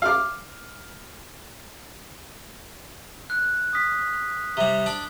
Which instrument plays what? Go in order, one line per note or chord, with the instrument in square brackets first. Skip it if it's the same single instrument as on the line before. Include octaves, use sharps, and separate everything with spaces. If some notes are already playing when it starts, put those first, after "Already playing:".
[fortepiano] F5 D6
[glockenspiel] F#6
D#6 B6
[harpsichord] C3 G3 [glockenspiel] G7
[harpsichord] D4 D6